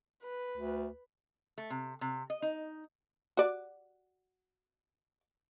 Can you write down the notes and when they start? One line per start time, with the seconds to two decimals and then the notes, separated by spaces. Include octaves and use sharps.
0.23 B4
0.57 D2
1.58 A3
1.70 C3
2.01 C3
2.30 D#5
2.42 D#4
3.37 F#4 D5